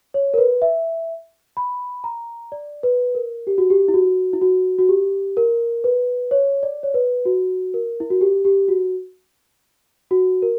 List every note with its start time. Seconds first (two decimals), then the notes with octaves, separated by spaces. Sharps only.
0.14 C#5
0.34 A#4
0.38 B4
0.62 E5
1.57 B5
2.04 A#5
2.52 D5
2.83 B4
3.15 A#4
3.47 G4
3.58 F#4
3.70 G4
3.88 E4
3.94 F#4
4.33 E4
4.42 F#4
4.79 F#4
4.89 G4
5.37 A#4
5.84 B4
6.31 C#5
6.63 D5
6.83 C#5
6.94 B4
7.25 F#4
7.74 A#4
8.00 E4
8.10 F#4
8.21 G4
8.45 G4
8.68 F#4
10.11 F#4
10.42 A#4